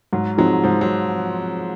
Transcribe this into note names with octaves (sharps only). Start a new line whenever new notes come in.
G#2 F#3
F3 F#3 G#3 C4 D#4
G#2 F3
F#3